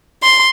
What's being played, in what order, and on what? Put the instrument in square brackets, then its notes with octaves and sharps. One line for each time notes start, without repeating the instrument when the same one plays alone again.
[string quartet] C6